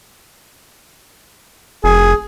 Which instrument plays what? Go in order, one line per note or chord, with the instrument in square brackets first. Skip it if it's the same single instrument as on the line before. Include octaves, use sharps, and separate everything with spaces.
[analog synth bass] F1 [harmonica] G#4